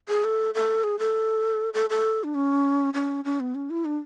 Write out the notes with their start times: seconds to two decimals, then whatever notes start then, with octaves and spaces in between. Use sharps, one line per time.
0.09 G#4
0.24 A4
0.54 A4
0.84 G#4
0.99 A4
1.74 A4
1.90 A4
2.24 D4
2.35 C#4
2.94 C#4
3.25 C#4
3.40 B3
3.55 C#4
3.70 E4
3.85 D4